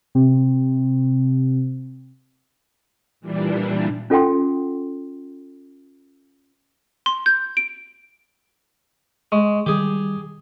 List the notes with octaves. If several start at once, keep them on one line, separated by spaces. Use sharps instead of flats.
C3 C4
A#2 E3 G3 D4
C#4 F4 A4 F#5 G5 C6
C6
G6
D7
G#3 C#6
D#3 G3 G4 G#4